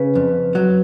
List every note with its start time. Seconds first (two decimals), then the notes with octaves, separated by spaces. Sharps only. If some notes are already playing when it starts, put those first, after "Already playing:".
Already playing: C#3 B4
0.15 F2
0.55 F#3